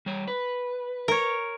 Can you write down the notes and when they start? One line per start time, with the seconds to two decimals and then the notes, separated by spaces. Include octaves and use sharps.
0.06 G3 C#5
0.28 B4
1.08 A#4 C#5